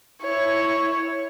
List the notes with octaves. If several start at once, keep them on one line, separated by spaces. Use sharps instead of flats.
E4 C#5